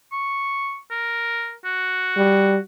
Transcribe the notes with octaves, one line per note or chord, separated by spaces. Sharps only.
C#6
A#4
F#4
G3